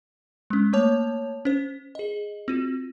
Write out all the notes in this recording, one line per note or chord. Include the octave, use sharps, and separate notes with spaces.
G#3 C#4
A3 A#3 C#5 A5 F7
C#4 C5
G#4 D#5
C4 F4 F#4